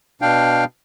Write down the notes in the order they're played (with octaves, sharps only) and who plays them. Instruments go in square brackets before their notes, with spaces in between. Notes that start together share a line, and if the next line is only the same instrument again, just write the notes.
[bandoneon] B2 D4 F5 G5